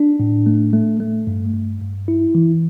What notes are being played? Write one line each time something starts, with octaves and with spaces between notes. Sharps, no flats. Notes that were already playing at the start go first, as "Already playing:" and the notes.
Already playing: D4
A2
A3
A3
A3
G2
G2
G2
E4
E3